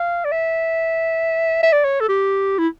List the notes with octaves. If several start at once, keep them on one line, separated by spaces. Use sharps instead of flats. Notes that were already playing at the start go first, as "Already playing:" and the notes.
Already playing: F5
D5
E5
E5
D5
C#5
A4
G4
E4